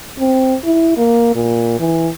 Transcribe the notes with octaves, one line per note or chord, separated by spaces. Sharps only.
C4
E4
A#3
A#2
E3